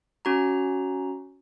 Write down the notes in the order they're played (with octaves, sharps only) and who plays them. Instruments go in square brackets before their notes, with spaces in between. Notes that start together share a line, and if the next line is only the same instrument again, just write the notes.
[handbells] C#4 F#4 A#5